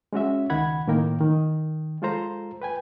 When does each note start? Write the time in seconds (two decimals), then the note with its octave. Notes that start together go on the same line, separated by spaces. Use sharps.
0.13 G#3 C#4 F#4 E5
0.50 C#2 D#3 F#5 B5 G#6
0.87 A2 D#3 A#3 A#4 G5
1.20 D#3
2.02 G#3 F4 A4 C5 A#5
2.62 B4 G5 G#5